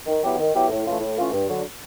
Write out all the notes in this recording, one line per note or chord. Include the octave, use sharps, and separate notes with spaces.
D#3
F#3 B3 E4 G4
D#3
F#3 B3 E4 G4
A2
E3 A3 C#4 F4
A2
E3 A3 C#4 F4
G2
D3 F#3